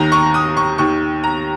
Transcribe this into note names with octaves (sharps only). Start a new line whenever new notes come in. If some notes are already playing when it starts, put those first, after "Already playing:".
Already playing: D#2 D#3 A#5
C#6
D#6
C#6
D#2 D#3 C#6
A#5